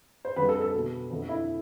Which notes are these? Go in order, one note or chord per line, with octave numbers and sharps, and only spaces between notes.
C5
F2 D3 G3 B4
A4
A4
B2 A3
F2 D3 A3
E4